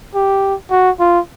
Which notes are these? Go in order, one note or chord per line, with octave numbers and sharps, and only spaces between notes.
G4
F#4
F4